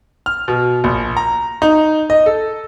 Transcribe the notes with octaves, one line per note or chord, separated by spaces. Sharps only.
F6
B2
A#1
A#5
D#4
D#5
A4